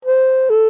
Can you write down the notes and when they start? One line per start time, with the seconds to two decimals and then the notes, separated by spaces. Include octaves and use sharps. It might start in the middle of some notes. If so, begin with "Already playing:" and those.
0.05 C5
0.50 A4